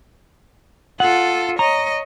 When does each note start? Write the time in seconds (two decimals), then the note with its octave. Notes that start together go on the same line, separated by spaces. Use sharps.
1.00 F4 A4 F#5
1.59 C#5 D#5 A#5